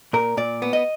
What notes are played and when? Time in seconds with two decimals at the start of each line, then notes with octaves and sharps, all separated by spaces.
0.13 A#2 A#4
0.37 A#2 D5
0.62 B3
0.73 D#5